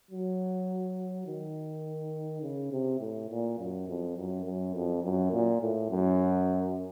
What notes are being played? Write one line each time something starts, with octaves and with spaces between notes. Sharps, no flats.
F#3
D#3
C#3
C3
A2
A#2
F#2
F2
F#2
F#2
F2
F#2
A#2
A2
F#2